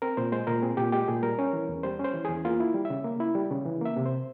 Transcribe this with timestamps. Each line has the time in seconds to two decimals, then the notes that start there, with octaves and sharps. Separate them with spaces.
0.02 C4 A#4
0.17 A#2 C5
0.32 G#3 C5
0.47 A#2 A#4
0.62 C4 G#4
0.77 A#2 G4
0.93 G#3 G4
1.08 A#2 G#4
1.23 G3 A#4
1.39 C#4
1.53 E3
1.69 E2
1.83 G3 C5
1.99 C#4
2.04 C5
2.14 E3
2.25 E2 G#4
2.45 A#3 F4
2.60 E4
2.74 G3
2.85 E5
2.90 C#3
3.05 A#3
3.20 E4
3.35 G3
3.51 C#3
3.65 E3
3.81 A#3 E5
3.97 C3
4.06 C5